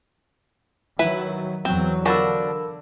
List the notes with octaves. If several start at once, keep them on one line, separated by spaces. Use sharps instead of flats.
D#3 F#3 E4 B4
E2 E3 F#3 C4
D3 F3 D4 F#4 A#4 B5 E6